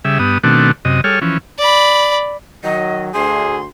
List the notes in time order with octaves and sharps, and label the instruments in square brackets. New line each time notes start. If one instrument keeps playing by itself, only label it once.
[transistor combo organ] C#3 G3 G#4 E5
G2 B3 D#6
B2 D#3 A3 C4 D4 F#4
F#2 C3 D#5
G3 G#4 A4 C#5 F6
E3 F3 C#4
[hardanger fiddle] D5 B5
[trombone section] D#3 F#3 [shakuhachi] D#5
[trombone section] D2 [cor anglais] G#4 [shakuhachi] C6